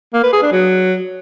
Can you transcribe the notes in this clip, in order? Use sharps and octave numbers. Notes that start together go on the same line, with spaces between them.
A#3
B4
G#4
D4
F#3